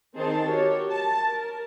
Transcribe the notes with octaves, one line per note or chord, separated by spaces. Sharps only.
D#3 C4 D#4 G#4 C5 A5
F#4 G4 A#4 C#5
A5
A#4